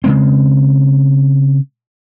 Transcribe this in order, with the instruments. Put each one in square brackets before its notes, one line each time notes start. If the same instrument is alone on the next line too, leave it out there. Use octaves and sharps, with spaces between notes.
[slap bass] C#3 G#3 C4